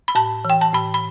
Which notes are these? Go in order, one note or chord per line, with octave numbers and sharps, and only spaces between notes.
B5
A2 A5
E3 G5
A5
A2 B5
B5